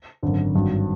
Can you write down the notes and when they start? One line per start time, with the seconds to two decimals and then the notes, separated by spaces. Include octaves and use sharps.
0.23 G#1 F#2 D3
0.54 G#1 G2 D#3 F#3